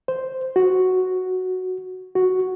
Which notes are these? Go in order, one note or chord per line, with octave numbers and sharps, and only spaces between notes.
C5
F#4
F#4